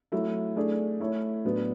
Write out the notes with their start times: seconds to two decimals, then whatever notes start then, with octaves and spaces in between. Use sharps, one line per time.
0.12 F#3 A3 E4
0.56 A3 D4 G#4 D5
1.00 A3 E4 A4 C#5
1.45 A2 F#3 B3 D4 F#4